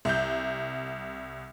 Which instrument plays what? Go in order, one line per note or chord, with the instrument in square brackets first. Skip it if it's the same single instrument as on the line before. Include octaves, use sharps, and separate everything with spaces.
[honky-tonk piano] C2 G6